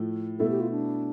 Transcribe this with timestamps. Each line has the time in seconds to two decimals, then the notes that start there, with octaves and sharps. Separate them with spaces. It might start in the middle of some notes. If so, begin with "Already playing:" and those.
Already playing: A2 F3 A3
0.39 B2 A3 E4 A4
0.50 G4
0.60 F4
0.71 D4